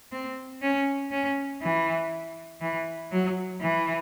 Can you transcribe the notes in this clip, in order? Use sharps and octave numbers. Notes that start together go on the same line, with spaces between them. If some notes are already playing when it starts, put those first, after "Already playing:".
C4
C#4
C#4
E3
E3
F#3
E3